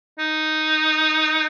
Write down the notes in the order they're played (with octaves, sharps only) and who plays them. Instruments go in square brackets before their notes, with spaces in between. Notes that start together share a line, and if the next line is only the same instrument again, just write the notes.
[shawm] D#4